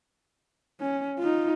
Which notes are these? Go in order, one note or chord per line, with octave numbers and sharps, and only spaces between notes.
C#4
D#4 F4